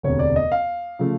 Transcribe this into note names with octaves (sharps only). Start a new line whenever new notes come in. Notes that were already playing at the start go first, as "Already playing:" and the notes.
E1 D2 C3 C#5
D5
D#5
F5
C#3 F3 A3